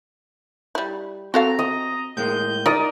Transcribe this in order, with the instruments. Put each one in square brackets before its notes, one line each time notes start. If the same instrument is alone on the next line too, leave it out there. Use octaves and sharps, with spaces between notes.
[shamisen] G3 E4
[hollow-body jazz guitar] C4 A5 [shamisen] F#4 A4 F5 [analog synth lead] A#5
[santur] D#5
[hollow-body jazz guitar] A2 G#3 A#3 [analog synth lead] G6
[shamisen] D#4 [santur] A#4 D#5 [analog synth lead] D5